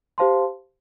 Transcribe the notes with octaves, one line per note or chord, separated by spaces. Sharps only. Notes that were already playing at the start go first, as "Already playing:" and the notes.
G4 C5 F5 A5 C6